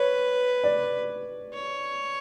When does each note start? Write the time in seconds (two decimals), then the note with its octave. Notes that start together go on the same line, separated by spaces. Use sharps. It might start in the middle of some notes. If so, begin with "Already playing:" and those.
Already playing: B4 C#5
0.64 D5
1.54 C#5